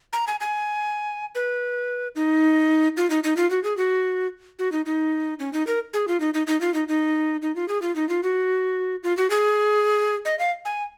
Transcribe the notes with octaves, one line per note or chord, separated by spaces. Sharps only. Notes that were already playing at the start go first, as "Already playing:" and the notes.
A#5
G#5
G#5
B4
D#4
F4
D#4
D#4
F4
F#4
G#4
F#4
F#4
D#4
D#4
C#4
D#4
A#4
G#4
F4
D#4
D#4
D#4
F4
D#4
D#4
D#4
F4
G#4
F4
D#4
F4
F#4
F4
F#4
G#4
D#5
F5
G#5